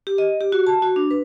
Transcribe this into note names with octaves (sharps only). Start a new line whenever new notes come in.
G4
D#5
G4
F#4
A5
F#4
D4
B4